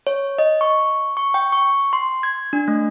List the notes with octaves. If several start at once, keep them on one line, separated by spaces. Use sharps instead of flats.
C#5
D#5
C#6
C#6
G5
C#6
C6
G#6
D4
A3